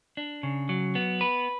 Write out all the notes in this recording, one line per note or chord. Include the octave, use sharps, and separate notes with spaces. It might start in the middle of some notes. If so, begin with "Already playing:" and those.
D4
C#3
F#3
B3
B4